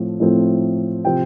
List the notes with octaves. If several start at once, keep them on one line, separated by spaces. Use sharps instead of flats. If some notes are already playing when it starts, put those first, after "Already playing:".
Already playing: A2 F3 A3 C4
A2 F3 A3 C4
C3 F3 C4 G5